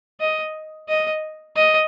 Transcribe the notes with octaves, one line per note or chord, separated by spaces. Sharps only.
D#5
D#5
D#5